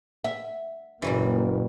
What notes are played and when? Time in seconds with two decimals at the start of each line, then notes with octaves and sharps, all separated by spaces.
0.24 E5
1.02 F#1 A#2 E3 F#3 G3